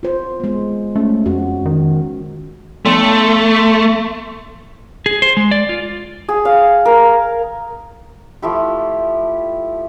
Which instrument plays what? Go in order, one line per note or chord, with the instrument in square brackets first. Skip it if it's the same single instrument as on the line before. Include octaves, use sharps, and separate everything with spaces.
[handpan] F4 C5
G#3 B3
[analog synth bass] A3 [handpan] C#4
[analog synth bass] F2 [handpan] F#4
[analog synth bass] D#3
[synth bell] F3 B3 C6 [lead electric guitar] A3
[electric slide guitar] G#4
C5
G#3
D5
F4
[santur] G#4
F5
A#4
F3 A3 E4 G4